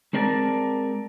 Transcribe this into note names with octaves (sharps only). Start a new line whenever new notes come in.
G#3 C4 D4 A#4 D5 A5